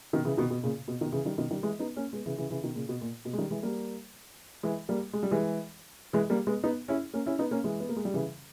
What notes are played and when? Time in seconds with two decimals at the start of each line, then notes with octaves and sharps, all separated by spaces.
0.13 B2 D#3
0.25 C#3 E3
0.37 B2 D#3
0.50 B2
0.63 A#2 C#3
0.88 B2
1.01 B2 D#3
1.12 C#3 E3
1.25 D#3 G3
1.38 B2 D#3
1.51 D#3 G3
1.63 E3 G#3
1.79 B3 D#4
1.97 A#3 C#4
2.13 G#3 B3
2.26 C#3 E3
2.38 C#3 E3
2.50 C#3 E3
2.63 B2 D#3
2.75 A#2 C#3
2.89 B2
3.01 A#2
3.25 B2
3.33 G#3
3.38 D#3 G3
3.51 E3 G#3
3.63 G3 A#3
4.63 E3 G#3
4.89 G3 A#3
5.13 G#3
5.23 G3
5.31 E3 G#3
6.13 E3 G#3
6.30 G3 A#3
6.47 G#3 B3
6.64 B3 D#4
6.88 C#4 E4
7.14 A#3 C#4
7.26 C#4 E4
7.39 B3 D#4
7.51 A#3 C#4
7.64 E3 G#3
7.80 B3
7.89 A#3
7.96 G#3
8.05 G3
8.14 C#3 E3